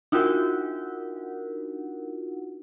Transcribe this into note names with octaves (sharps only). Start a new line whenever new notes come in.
D4 D#4 F4 F#4 A#4 F#5